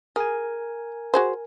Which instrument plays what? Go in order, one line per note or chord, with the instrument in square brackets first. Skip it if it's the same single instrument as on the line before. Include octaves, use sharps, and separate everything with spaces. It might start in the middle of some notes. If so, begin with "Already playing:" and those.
[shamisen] G#4 [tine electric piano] A#4 G#5
[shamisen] F#4 G#4 C5